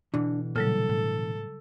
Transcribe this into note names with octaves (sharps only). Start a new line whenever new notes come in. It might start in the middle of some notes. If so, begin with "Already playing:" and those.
B2 D3 E3 D4
A#2 C#3 F#3 G3 A4
A2